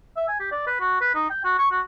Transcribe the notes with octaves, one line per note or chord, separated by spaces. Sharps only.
E5
G#5
G4
D5
B4
F#4
B4
D#4
G5
F#4
C#6
F#4